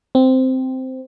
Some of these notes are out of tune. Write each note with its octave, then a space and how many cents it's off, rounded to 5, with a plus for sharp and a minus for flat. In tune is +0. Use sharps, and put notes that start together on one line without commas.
C4 -5